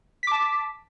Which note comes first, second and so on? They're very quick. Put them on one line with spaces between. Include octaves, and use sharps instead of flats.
B6 D6 A5